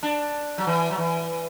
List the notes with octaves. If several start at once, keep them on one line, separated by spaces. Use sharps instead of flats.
D4
F#3
E3
F#3
E3